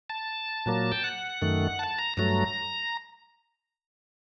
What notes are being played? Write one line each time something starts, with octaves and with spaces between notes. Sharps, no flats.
A5
A#2 F#3 A#3
G5
F#5
F#2 D#3 A3
A5
A#5
G2 F#3 A3 A#5